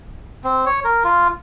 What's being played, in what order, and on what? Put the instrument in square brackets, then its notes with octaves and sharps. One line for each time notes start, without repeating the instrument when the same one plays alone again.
[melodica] C4
C#5
A#4
F4